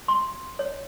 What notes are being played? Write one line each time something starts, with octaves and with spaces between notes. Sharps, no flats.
C6
C#5